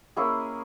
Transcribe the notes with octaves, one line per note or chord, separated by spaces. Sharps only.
A#3 C#4 E4 G#4